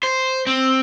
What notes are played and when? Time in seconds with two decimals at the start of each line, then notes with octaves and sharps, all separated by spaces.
0.03 C5
0.47 C4